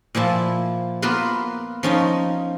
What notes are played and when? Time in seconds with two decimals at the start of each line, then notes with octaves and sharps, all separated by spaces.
0.15 A#2 F3 E4 A5
1.02 A#3 B3 F4 B4 C6
1.83 F3 C#4 D#4